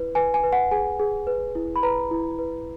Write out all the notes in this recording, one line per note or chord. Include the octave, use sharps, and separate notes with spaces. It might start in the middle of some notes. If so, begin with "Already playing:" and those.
Already playing: E4 B4
B4 G#5
G#5
B4
F#5
G#4 G#5
G#4
B4
E4
B5
B4 A#5
E4
B4